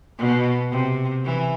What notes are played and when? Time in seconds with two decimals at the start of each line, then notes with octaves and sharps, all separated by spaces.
0.18 B2
0.71 C3
1.24 E3